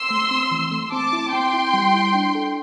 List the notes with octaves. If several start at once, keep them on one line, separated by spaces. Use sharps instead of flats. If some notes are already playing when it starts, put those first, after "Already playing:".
Already playing: C6 E6
A3
C4
E3
A3
C4 A5 D6
E4
C4 G5 C6
E4
G3
E4
D4
A4